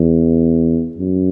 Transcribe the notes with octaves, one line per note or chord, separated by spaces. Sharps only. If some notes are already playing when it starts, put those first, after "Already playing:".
Already playing: E2
F#2